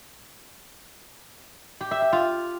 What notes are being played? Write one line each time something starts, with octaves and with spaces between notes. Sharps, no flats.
G4
E5
E5
F4